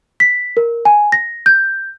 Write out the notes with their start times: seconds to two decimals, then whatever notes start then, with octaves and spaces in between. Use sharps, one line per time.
0.20 B6
0.57 A#4
0.85 G#5
1.12 A#6
1.46 G6